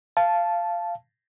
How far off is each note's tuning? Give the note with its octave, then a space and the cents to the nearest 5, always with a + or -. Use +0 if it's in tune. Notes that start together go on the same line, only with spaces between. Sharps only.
F5 -15 A5 -10